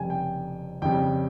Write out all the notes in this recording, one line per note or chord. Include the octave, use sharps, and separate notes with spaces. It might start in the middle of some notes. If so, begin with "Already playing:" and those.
Already playing: F1 F2 C#3 G3 G5 G#5
G5
F2 C#3 G3 G5